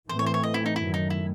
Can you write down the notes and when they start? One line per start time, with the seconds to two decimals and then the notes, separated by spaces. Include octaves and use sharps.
0.09 A2 E3 A3 C4 C5
0.19 C#5
0.26 C5
0.34 C#5
0.43 D#5
0.54 E4
0.66 D#4
0.76 F#2 D#3 F#3 A3 E4
0.94 D#4
1.10 E4